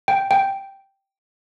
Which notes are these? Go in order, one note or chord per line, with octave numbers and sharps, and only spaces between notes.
G5
G5